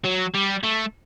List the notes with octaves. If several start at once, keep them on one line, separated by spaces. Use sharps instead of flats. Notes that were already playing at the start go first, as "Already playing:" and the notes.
F#3
G3
A3